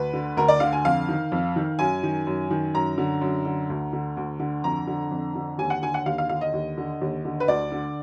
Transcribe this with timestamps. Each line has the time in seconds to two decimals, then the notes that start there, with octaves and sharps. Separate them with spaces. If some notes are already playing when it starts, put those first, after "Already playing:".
Already playing: D2 B4
0.14 D3
0.37 D2 A#4
0.48 D5
0.60 D3 F5
0.73 G#5
0.85 F2 F5
1.09 D#3
1.32 F2
1.56 D#3
1.79 F#2 G#5
2.03 D#3
2.27 F#2
2.51 D#3
2.74 F#2 A#5
2.98 D3
3.21 F#2
3.45 D3
3.70 D2
3.93 D3
4.17 D2
4.40 D3
4.64 F2 A#5
4.87 D3
5.11 F2
5.35 D3
5.58 D#2 G#5
5.70 F#5
5.82 D3 G#5
5.94 F#5
6.06 D#2 F5
6.18 F5
6.29 D3 F5
6.41 D#5
6.53 D#2
6.78 D3
7.01 D#2
7.25 D3
7.40 B4
7.48 D2 D5
7.72 D3